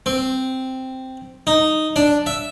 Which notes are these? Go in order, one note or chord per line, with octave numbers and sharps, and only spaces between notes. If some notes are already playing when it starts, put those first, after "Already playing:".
C4
D#4
D4
E5